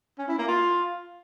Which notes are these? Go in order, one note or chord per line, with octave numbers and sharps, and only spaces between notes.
C#4
E4
A#3
F4